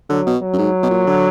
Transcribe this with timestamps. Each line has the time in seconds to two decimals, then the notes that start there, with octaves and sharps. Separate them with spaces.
0.10 D3 F#3
0.27 B2
0.42 F#3
0.53 F#2
0.58 G#2
0.83 B2
0.90 A#2
1.07 D3